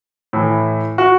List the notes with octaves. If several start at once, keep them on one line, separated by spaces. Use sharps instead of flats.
A2 E3
F#4